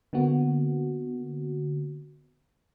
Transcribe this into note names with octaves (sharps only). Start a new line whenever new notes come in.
D3 A#3 B3 F#4